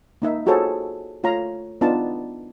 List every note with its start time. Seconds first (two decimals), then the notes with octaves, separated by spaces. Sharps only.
0.22 A#3 D#4 E5
0.46 F4 F#4 G#4 A4 C5 C#5
1.23 A3 F4 C#5 F5 A#5
1.81 B3 D4 D#4 F4 A5